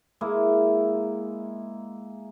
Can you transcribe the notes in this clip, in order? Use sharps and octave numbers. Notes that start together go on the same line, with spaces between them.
G#3 A#3 E4